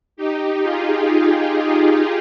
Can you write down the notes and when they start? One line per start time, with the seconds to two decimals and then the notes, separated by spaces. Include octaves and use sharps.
0.17 D#4 G4
0.62 F4 G#4